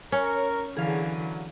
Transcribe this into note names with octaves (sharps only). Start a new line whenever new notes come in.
C#4 A#4 C#5
D3 E3 F#3 G#4 F5